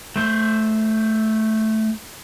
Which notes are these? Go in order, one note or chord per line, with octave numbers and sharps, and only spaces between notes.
A3 C5